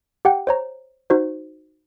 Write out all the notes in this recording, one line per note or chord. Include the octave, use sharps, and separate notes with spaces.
G4 F#5 G5
C5 C#5 A#5
D#4 F#4 C5